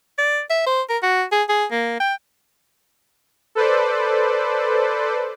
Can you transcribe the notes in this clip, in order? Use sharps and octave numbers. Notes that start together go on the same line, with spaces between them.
D5
E5
C5
A#4
F#4
G#4
G#4
A#3
G5
A4 B4 C5 D5